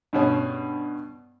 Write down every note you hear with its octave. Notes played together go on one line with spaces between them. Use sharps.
G2 B2 C#4